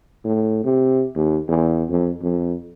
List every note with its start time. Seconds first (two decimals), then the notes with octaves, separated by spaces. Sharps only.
0.24 A2
0.64 C3
1.15 D#2
1.48 E2
1.89 F2
2.22 F2